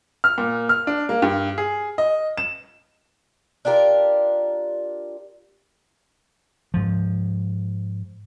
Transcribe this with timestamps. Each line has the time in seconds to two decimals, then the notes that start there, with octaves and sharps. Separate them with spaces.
0.24 F6
0.38 A#2
0.69 F6
0.87 D4
1.09 A#3
1.22 G2
1.58 G#4
1.98 D#5
2.38 E7
3.65 D4 F4 G4 A#4
6.74 G#2 F3